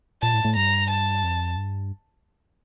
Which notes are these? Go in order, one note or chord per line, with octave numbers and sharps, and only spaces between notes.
A#2 A5
A2
A2
G2 A#5
A5
F2
G2